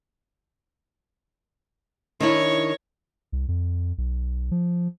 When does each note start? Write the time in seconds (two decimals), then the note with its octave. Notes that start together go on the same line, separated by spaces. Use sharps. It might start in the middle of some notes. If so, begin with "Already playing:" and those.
2.20 D#3 D4 E4 C#5
3.32 C2
3.48 F2
3.98 B1
4.51 F3